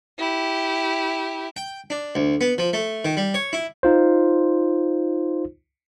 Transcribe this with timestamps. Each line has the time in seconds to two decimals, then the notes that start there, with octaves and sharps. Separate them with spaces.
0.18 E4 G4
1.57 G5
1.90 D4
2.15 D2
2.41 B3
2.58 F3
2.73 A3
3.05 D#3
3.17 G3
3.34 C#5
3.53 E4
3.83 D#4 F4 C5